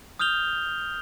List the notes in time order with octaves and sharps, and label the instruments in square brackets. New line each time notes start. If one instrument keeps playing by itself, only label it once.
[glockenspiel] D#6 F6 G6 F7 G7